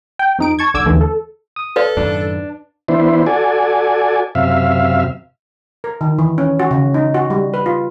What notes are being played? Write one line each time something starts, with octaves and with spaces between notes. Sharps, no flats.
G5
F2 D#4 D7
A5 C#6 G#6
B1 D3 D6 E6 G#6
D#2 D3 E3 A3
A4
D#6
A4 B4 D5 F5
F#2 A2 D#3 D4
E3 B3 D4 E4 C5
F#4 A4 D5 G#5
F#2 C3 E5 F5
A#4
D#3
E3
C#4
F#4
C#3
D#4
F#4
G3
B4
F4